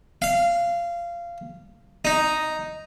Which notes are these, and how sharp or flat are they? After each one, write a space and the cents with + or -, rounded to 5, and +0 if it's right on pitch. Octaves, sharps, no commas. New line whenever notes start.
F5 -20
D#4 +0